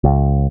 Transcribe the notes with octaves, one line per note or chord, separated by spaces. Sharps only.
C#2